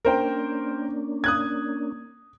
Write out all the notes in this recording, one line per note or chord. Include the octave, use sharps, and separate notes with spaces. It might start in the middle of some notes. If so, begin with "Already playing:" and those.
A#3 C#4 D4 A#4 C5 G5
D#6 F#6 G#6